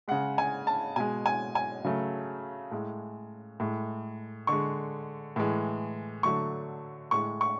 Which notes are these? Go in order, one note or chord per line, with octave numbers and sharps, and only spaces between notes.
C#3 G#3 F#5
G#5
A5
B2 G#3 G#5
G#5
G#5
C#3 F#3 A3
A2 G#3
A2 G#3
D3 G#3 C#6
A2 E3 G#3
D3 F#3 A3 C#6
A2 G#3 C#6
C#6